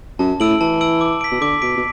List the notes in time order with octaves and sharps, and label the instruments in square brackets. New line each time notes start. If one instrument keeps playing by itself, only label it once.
[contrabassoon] F#2 [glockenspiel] A5
[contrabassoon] A2 [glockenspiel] E6 D7 F#7
[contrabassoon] E3 [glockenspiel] A5
[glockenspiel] E6 D7 F#7
D6
B6 D7
[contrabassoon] B2
[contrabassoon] D3 [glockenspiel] D6
[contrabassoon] B2 [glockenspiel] B6 D7
[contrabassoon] B2